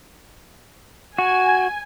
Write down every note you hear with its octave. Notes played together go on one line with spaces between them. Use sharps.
F#4 G#5